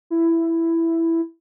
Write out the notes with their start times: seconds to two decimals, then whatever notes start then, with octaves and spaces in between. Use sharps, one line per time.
0.10 E4